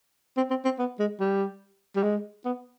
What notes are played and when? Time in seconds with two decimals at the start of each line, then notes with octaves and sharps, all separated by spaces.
0.37 C4
0.50 C4
0.65 C4
0.79 B3
0.99 G#3
1.20 G3
1.96 G3
2.03 G#3
2.45 B3